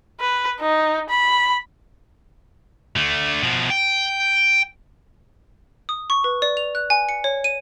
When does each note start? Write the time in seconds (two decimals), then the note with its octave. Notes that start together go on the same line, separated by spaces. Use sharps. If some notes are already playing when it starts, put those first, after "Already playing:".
0.20 B4
0.60 D#4
1.10 B5
2.96 D3 A3
3.42 B2 F3
3.70 G5
5.89 D#6
6.10 C#6
6.24 B4
6.42 D5
6.57 F7
6.75 F#6
6.90 G#5
7.09 C#7
7.24 C#5
7.44 D#7